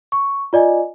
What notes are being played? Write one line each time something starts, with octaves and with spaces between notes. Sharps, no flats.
C#6
F4 D5 D#5 G#5